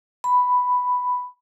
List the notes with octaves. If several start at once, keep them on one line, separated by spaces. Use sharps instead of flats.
B5